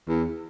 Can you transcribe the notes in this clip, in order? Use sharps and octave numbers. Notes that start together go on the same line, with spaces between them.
E2